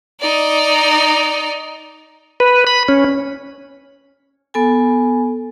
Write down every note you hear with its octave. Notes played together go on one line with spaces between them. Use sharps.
D#4 D5
B4
B5
C#4
B3 A4 G#5